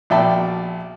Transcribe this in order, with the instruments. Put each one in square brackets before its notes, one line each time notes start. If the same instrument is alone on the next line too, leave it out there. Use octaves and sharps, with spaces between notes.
[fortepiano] A#1 B2 D5 E5 G5 A5